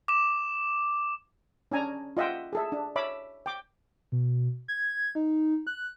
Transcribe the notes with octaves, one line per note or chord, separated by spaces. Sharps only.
D6 E7
C#4 D4 G#5 A#5
F4 D#5 E5 F#5 G5
G#4 A4 E5
D4
C#5 E5 B5 D6
G5 D6
B2
G#6
D#4
F#6